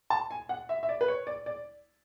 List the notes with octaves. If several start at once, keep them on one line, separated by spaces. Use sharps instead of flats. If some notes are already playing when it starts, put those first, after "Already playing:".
A5
G#5
F#5
E5
E5
D5
B4
C#5
D5
D5